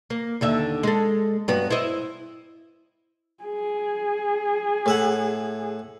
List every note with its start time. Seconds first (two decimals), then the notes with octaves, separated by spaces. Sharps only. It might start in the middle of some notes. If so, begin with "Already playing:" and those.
0.10 A#3
0.41 D#2 D3 E5
0.83 G#3 A4
1.48 G2 F#3 B3
1.70 E4 C5 D#5
3.44 G#4
4.86 A2 E5 F#5